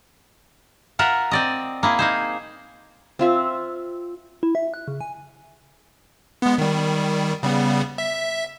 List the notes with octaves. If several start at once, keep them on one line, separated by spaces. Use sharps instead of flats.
F4 A#4 E5 F#5
C4 D5 D#5
A#3 E4 G#4
A#3 D#4 C5
C4 F4 E5
E4
E5
F#6
C#3
G#5
G#3 B3
D#3 G3
C#3 G3 B3
E5